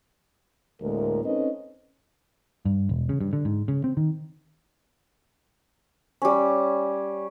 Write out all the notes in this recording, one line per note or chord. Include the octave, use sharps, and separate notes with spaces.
D2 A2 G#3 A#3 A#4
C4 C#4 D#4 A4 B4 D#5
G2
E1
C#3
G2
D3
G#2
C#3
C4
D#3
G3 C#4